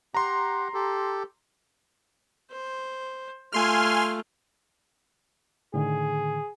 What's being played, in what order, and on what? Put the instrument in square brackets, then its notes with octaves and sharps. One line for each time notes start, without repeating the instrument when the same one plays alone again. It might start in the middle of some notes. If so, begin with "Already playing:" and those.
[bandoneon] G4 F#5 [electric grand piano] A#5 C6
[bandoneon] G4 A4
[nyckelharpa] C5
[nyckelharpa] A3 F4 [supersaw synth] G#5 C6 F6
[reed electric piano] A2 D3 D#3 [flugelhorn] G#4